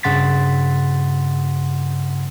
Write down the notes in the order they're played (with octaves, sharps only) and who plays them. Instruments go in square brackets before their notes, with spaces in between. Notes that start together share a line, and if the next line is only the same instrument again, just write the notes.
[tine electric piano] G2 C#3 F#5 C6 A6 B6